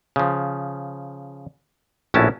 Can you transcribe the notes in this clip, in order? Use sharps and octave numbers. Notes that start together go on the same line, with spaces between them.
C#3 F3
A#1 A2 C#4 E4 F#4 A5